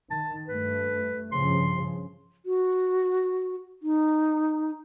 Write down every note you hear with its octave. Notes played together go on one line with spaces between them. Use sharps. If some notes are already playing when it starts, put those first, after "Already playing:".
D#3 A5
G2 A3 B4
G2 C#3 F3 C6
F#4
D#4